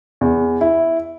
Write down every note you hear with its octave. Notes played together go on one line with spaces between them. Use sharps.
E2
E4